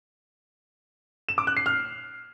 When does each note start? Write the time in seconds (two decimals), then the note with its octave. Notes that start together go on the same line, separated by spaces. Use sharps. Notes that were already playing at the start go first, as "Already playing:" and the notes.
1.29 E7
1.38 D6
1.47 F#6
1.57 C7
1.66 F6